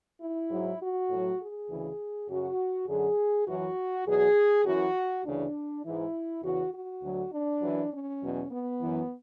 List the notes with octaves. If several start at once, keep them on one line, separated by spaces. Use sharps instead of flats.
E4
G#2 F#3
F#4
A2 F#3
G#4
D2 C#3 E3
F#2 C#3 F#3 F#4
F#2 D3 F#3 G#4
F#2 E3 F#4
E2 B2 F#3 G#4
F#2 E3 F#4
D2 C#3 E3 D4
G#2 E3 E4
E2 C#3 E3 F#4
F#4
D2 D3 F#3
D4
F#2 E3
C#4
E2 B2 F#3
B3
F#2 E3